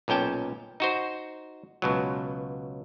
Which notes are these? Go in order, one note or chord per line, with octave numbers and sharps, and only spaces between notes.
B1 A#2 C#4 G5 A5
D#4 F#4 C5
C#2 B2 F#3